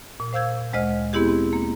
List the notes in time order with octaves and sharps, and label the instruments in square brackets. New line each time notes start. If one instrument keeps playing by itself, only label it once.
[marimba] A#2
C5 F5 E6 G6 G#6
D2 G#3 C5 D#5 F6
B3 C4 E4 G4 G#4
C4
A#3